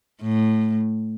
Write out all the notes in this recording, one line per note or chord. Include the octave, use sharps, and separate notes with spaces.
A2